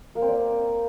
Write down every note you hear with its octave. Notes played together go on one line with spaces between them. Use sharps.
A#3
C4
D5